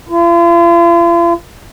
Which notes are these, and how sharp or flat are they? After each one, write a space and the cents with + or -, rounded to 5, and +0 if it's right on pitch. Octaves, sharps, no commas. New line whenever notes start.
F4 -45